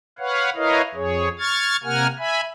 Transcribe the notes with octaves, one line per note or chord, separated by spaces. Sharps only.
B4 C#5 F5 F#5
E4 A#4 B4 C#5 D#5 F5
F2 G#4 C#5
C#6 F6 G#6 A6
C3 A#3 A#4 F#5 G#5 F6
E5 G#5 B5